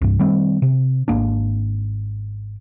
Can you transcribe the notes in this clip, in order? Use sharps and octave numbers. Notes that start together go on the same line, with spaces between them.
C2 G2
D#3 G3 C4
C3
G#1 G2 A#3 D4